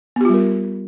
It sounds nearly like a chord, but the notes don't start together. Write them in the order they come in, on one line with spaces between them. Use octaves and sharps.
B3 G4 F4 G3 A#4